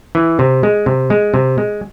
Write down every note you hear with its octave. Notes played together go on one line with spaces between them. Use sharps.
E3
C3
G#3
C3
G#3
C3
G#3